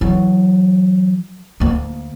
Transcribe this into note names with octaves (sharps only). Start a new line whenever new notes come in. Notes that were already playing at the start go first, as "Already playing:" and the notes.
E3 F#3
D2 A#3